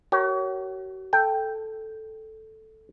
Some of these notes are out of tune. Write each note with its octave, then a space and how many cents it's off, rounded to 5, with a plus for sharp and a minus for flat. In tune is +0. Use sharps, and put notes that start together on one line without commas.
F#4 +40 A#4 -5 C#5 +0
A4 +0 G5 +0